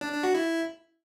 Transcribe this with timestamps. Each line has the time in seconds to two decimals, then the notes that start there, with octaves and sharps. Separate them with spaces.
0.01 D4
0.12 D4
0.23 F#4
0.35 E4